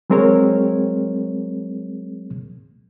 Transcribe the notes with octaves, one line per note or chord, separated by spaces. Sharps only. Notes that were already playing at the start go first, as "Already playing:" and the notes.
F#3 G#3 C4 G#4 A#4 C#5